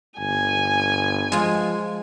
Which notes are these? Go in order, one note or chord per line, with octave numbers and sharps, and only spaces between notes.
G1 G#5
F3 G#3 F4